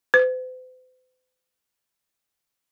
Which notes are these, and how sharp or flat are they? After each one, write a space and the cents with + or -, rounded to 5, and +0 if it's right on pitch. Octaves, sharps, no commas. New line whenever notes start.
C5 -45